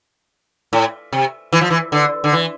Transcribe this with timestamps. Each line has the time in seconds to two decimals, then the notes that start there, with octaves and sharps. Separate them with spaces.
0.73 A2
1.12 C3
1.53 E3
1.61 F3
1.70 E3
1.92 D3
2.24 D3
2.33 E3